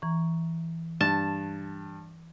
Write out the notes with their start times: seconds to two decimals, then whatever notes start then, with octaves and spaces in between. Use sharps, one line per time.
0.02 E3 A#5 C#6
1.01 G2 A5